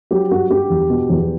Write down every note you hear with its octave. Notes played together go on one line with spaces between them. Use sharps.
F#3 G4
G2 F#4
G2 G4
E2
B2
E2